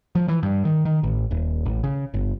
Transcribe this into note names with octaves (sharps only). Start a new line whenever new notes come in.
F3
E3
G2
D#3
D#3
A1
D#1
A1
C#3
G1